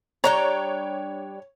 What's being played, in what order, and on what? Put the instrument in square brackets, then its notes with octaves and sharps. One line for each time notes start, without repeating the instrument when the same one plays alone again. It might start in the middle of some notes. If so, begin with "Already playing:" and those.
[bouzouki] G3 D4 G5 [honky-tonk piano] C#5 [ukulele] A#5